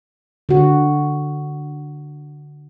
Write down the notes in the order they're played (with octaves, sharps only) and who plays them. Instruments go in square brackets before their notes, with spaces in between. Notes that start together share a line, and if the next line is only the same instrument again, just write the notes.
[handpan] D3 F#4